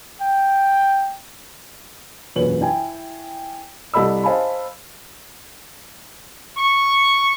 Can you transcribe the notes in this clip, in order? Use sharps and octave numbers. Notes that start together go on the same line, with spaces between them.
G5
E1 F#2 A#2 B4 C#5 F#7
E4 G5 G#5
C2 A4 D#5 B5 E6
C5 D#5 F5 G#5 A5 B5
C#6